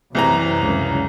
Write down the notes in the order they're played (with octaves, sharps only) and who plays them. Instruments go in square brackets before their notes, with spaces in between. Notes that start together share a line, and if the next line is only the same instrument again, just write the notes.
[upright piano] C2 E3 A#5 [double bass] F#2 [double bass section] C3
[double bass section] C#2 C#3